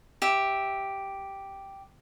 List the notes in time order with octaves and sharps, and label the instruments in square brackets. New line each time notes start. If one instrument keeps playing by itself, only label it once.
[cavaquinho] G4 E5